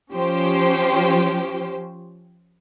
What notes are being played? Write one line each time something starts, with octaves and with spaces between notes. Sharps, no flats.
F3 C#4 G4 C5